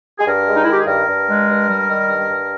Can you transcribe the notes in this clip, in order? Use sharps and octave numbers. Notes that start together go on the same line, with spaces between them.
G#4
G2 A#4
G#3
D#4
E4
D#3 G4
G#4
G2 A#4
G2
G#3
G2
G3
D#3
G2
G2